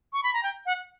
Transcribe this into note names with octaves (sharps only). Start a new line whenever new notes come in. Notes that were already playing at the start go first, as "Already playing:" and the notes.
C#6
B5
A#5
G5
F#5